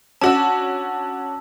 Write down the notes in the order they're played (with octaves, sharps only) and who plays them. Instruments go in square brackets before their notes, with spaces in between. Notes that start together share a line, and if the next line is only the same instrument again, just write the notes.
[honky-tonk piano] C#4 D4 F#4 [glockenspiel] A5 E6